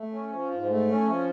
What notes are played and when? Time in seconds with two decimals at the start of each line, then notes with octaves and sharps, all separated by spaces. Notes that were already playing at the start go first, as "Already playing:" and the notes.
Already playing: A3
0.12 C#4
0.31 F3
0.51 G#2
0.69 A3
0.88 C#4
1.07 F3